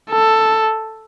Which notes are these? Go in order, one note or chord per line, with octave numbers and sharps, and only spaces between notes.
A4